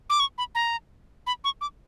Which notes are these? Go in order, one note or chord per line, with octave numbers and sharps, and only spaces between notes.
D6
C#6
B5
A#5
B5
C#6
D6